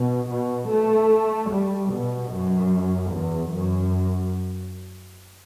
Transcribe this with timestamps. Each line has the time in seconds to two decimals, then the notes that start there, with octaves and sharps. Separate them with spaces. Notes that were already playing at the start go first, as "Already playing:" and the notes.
Already playing: B2
0.31 B2
0.71 A3
1.51 G3
1.92 B2
2.32 F#2
3.13 E2
3.54 F#2